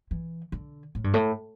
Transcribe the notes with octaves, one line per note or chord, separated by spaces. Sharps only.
E3
D3
A2
G2
A2